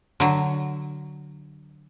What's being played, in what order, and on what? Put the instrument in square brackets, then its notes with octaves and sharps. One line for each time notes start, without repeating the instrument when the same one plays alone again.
[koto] D3 F#3